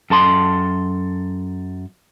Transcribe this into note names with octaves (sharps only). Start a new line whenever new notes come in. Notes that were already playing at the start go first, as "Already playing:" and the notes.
F#2 A4 A5 C6